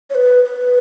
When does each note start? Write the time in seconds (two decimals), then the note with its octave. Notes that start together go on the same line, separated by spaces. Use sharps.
0.10 C#5
0.15 B4
0.45 B4